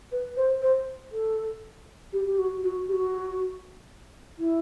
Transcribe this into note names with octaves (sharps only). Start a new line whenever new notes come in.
B4
C5
C5
A4
G4
G4
F#4
F#4
G4
F#4
E4